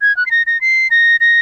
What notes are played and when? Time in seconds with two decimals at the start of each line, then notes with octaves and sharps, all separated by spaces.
0.01 G#6
0.17 F#6
0.26 C7
0.31 A#6
0.47 A#6
0.61 C7
0.91 A#6
1.20 A#6